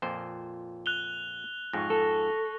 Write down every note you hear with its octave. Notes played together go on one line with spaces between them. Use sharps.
F2 A#2 C5
F#6 F7 G7
F2 G#2 C#6 A#6
A4